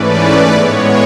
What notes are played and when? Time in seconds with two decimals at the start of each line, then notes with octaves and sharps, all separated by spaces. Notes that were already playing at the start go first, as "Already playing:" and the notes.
Already playing: G#2 E3 A3 C#4 B4 D5
0.50 A2 G#3 B3 C#5